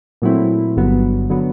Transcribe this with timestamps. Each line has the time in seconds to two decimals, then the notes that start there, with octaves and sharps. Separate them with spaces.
0.22 A#2 F#3 A3 C4 E4
0.76 G1 G2 D3 F#3 B3
1.30 D3 F#3 B3